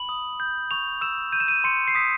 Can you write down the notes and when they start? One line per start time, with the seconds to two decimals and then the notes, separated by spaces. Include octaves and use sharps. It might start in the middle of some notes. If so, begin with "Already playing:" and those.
Already playing: B5 F#7
0.09 D#6
0.40 G6
0.71 C#6 F7
1.01 E6 E7
1.32 G6 D#7
1.40 E7
1.48 D#7
1.64 C6 C#7
1.88 C7
1.95 D#6 B6